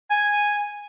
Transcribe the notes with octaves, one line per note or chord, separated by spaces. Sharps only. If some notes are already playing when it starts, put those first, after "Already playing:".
G#5